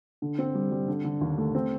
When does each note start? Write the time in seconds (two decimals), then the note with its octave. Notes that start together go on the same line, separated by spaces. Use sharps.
0.22 D3
0.38 C4
0.55 G3
0.71 G3
0.88 D3
1.04 D3
1.21 D#2
1.38 A3
1.55 C4